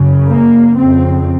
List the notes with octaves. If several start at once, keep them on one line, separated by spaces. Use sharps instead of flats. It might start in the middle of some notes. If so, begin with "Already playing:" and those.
Already playing: F#2 C#3
A#3
F2 C#3 C4